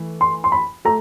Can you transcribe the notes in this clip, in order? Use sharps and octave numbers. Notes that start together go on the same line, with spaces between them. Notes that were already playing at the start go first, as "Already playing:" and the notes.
Already playing: E3 A3
C6
C6
B5
A3 A#5